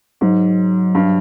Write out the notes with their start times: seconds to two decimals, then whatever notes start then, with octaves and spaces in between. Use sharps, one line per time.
0.21 G#2 F#3
0.95 G2